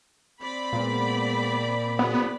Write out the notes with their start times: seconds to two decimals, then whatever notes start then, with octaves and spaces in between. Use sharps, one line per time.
0.41 C4 D5 B5
0.73 A#2 G#3 B3
1.99 F#1 C2 B3